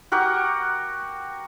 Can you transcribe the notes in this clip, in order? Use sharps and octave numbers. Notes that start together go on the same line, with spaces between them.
F#4 G4 A#4 F#5